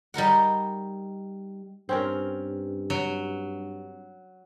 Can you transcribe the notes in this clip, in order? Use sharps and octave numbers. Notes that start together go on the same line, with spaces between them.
G3 D#4 A#4 F#5
G2 C4 C#4 A#4
F#3